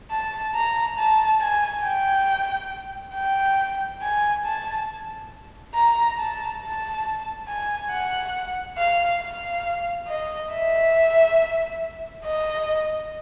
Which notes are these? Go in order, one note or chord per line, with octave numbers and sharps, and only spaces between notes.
A5
A#5
A5
G#5
G5
G5
G#5
A5
A#5
A5
A5
G#5
F#5
F5
F5
D#5
E5
D#5